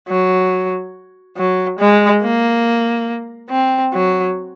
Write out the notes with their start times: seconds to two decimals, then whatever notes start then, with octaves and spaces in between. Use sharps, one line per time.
0.09 F#3
1.37 F#3
1.79 G#3
2.22 A#3
3.50 C4
3.93 F#3